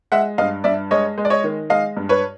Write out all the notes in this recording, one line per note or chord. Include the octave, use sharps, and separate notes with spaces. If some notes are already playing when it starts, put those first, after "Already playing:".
G#3 E5 F#5
G2 D#5 F5
G2 D5 E5
G#3 C#5 D#5
G#3
D5
C#5 D#5
D#3
G#3 D#5 F5
G2
B4 C#5